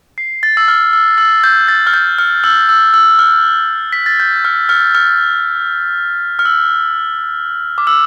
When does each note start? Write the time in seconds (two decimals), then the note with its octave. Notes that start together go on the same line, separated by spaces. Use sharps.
0.18 C7
0.43 A6
0.57 E6
0.68 F6
0.93 E6
1.18 E6
1.44 G6
1.68 A6
1.87 F6
1.94 G6
2.19 F6
2.44 E6
2.69 E6
2.94 E6
3.19 F6
3.93 B6
4.06 A6
4.20 G6
4.45 F6
4.69 F6
4.95 F6
6.39 F6
6.45 E6
7.78 D6
7.87 E6